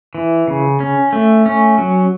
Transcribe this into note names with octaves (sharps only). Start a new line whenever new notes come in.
E3
C#3
C#4
A3
C#4
F#3